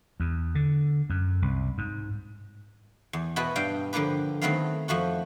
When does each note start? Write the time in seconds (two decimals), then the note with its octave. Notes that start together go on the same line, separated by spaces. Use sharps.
0.20 E2
0.55 D3
1.10 F#2
1.42 C2
1.78 G#2
3.13 E2
3.36 B2 B3 E4 F#4 B4 D#5
3.56 G2 G3 F5 G5
3.93 D3 F3 A#3 G4 B4
4.42 D#3 F#3 A3 B3 C4 F5
4.88 F2 F3 A3 F#4 F#5